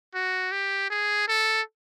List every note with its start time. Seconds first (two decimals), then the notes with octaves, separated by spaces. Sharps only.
0.14 F#4
0.52 G4
0.90 G#4
1.28 A4